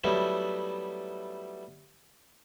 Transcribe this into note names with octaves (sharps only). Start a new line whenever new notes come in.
F#3 G3 A3 B3 D#4 E4